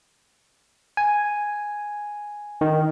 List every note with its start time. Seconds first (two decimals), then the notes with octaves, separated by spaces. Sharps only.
0.97 G#5
2.61 D#3